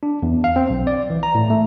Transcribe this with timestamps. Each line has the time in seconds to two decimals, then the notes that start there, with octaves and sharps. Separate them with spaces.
0.03 D4
0.23 E2
0.44 F5
0.56 C4
0.70 B1
0.87 D5
1.10 E3
1.23 A#5
1.35 A2
1.50 A3